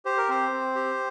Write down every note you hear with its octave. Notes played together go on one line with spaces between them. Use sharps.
G4 C5
A#4
C4 C5
C4
G4